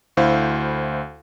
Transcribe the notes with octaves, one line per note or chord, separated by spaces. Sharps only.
D2 E4 C5 F5